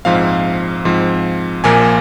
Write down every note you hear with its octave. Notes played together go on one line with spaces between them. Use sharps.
A#1 G#2 F3 C4 F5
G#2 F3 C4
A#1 A#2 F3 A#3 G#5